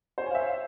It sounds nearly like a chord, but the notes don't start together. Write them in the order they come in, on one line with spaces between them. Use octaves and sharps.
C5 C#5 G#5 F5 E5